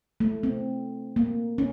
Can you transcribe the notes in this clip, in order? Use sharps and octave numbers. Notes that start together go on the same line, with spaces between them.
A3
C4
A#3
C#4